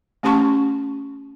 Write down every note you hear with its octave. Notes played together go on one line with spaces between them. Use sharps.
A3 C#4 G4 A5 C6 C#6